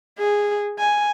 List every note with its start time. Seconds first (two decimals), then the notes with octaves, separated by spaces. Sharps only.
0.19 G#4
0.79 G#5